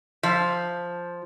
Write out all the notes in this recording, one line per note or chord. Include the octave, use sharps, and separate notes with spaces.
F3